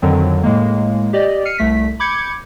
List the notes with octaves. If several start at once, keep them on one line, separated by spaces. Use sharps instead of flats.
F2 D3 D#3 F#3 C4
A2 G#3 A#3
G4 D5 D#5
F6 C7 C#7 D#7
C2 A3 B6
B5 D6 G6 G#6 C#7